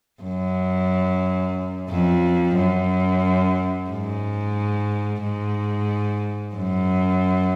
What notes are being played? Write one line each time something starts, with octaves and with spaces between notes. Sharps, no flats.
F#2
F2
F#2
G#2
G#2
F#2